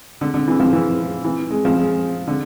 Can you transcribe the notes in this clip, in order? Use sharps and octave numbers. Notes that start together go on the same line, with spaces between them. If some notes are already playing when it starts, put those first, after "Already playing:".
D3
D3
E3
F3
E3
E3
G#3
F3
G#3
D3